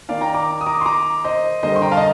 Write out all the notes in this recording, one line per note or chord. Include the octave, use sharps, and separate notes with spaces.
D#3 A#3 D#4 D5 F5
G5 A#5
A#5 D6
D#6
A#5 D6
C6
A#5 D6
C5 D#5
D3 G3 A#3 D4 C5 D#5
C6
G5 A#5
F5 A5
D#5